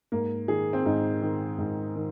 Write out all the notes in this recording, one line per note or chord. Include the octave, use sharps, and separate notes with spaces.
G#2 A#3
D#3 G#4
C4
G#2 D#4
D#3
G#2
D#3